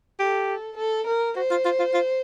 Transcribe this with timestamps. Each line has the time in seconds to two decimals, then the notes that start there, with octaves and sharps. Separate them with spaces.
0.20 G4 A4
0.78 A4
1.07 A#4
1.36 F#4 C5
1.51 F4
1.65 F4
1.79 F4
1.94 F4